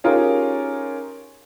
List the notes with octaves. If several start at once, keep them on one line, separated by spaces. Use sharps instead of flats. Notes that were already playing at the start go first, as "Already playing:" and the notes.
C#4 D#4 F4 G4 G#4 A#4